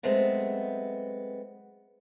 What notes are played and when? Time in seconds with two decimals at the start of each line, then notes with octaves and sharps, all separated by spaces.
0.03 F#3 G#3 A3 B3 C4